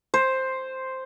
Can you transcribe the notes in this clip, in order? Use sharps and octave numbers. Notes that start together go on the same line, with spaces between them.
C5